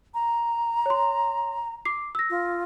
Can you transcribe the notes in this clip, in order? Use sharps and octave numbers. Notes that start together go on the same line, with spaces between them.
A#5
C#5 C6
D6 C7
E6 A#6
F4